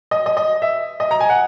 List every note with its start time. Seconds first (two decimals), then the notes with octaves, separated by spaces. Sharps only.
0.11 D#5
0.26 D#5
0.37 D#5
0.62 E5
1.00 D#5
1.11 A#5
1.20 G#5
1.30 F#5